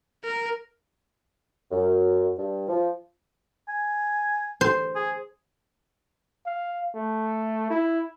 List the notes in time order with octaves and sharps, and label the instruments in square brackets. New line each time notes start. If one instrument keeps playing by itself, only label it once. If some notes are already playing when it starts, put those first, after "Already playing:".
[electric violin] A#4
[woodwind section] F#2
G2
F3
[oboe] G#5
[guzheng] C5
[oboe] G#4
[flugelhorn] F5
A3
E4